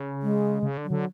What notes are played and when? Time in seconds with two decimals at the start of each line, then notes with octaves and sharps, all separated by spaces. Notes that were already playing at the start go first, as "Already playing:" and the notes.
Already playing: C#3
0.22 G#3
0.63 C#3
0.77 D3
0.84 F#3
0.91 D3